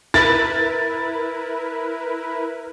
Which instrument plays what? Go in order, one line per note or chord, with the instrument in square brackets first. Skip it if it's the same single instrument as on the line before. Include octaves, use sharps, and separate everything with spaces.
[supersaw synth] E4 A#4 B4 [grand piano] A6